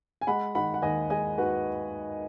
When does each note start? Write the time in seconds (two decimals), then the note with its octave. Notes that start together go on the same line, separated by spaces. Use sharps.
0.21 G#5
0.27 G#3 F#5 B5
0.55 D#3 F#5 B5
0.74 F#5
0.82 D#2 D#5 G#5
1.10 G#3 D#5 G#5
1.38 D#3 F#4 B4